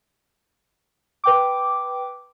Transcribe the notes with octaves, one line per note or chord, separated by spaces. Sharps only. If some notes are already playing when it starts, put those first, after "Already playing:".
B4 G5 D6